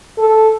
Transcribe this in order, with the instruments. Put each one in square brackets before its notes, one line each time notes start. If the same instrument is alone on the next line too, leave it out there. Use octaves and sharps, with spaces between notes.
[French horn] A4